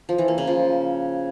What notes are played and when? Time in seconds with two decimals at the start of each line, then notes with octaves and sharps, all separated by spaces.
0.09 F3
0.18 E3
0.28 A#3
0.38 C#3
0.47 F3